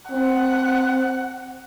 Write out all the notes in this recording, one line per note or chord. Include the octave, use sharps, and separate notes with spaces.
C4 F#5